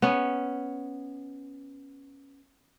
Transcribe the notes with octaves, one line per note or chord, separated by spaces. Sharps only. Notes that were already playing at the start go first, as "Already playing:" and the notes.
B3 C#4